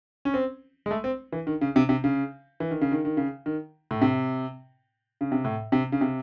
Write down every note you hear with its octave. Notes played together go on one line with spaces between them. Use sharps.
C#4
C4
G#3
A3
C4
E3
D#3
C#3
C3
C3
C#3
E3
D#3
C#3
D#3
D#3
C#3
D#3
A2
C3
C#3
C3
A2
C3
C#3
C3